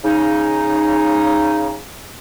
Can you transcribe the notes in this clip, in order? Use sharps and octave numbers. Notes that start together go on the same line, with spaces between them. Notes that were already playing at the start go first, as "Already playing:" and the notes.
C#3 D#4